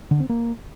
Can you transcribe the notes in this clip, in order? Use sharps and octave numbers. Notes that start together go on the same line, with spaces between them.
D3
C4
A#3